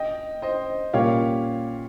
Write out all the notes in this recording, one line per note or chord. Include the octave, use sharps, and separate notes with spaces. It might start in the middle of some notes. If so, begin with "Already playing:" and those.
Already playing: D#5 G5
C5 D#5
A#2 G3 C#4 G4 A#4 C#5 F5